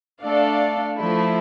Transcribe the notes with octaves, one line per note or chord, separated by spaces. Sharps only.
A3 D4 A4 D5 F5
F3 A3 E4